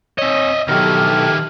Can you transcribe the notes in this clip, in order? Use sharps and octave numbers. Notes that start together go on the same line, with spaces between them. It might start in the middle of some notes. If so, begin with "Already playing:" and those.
C4 C#5 D#5 E5
B2 D#3 F#3 E4 G4 A4 F6